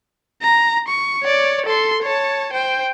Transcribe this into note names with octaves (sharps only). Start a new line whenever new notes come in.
A#5
C#6
C#5 D5
A4 C6
C#5 A5
C5 G5